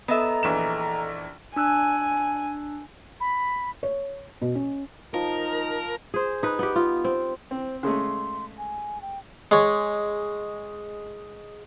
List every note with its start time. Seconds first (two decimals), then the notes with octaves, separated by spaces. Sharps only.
0.08 B3 A4 D#5 E5 A#5
0.43 A#1 E3 E7
1.56 D4 G#5 E6 F#6
3.20 B5
3.83 C#5
4.42 B2
4.55 C#4
5.14 F3 D#4 A#4
6.14 G#4 C5
6.43 D#4 B4
6.59 B3 G4
6.76 F4
7.04 C4
7.51 C4 C5
7.83 C#3 G#3 A3 C6
8.58 G#5
9.02 G5
9.51 G#3 C#5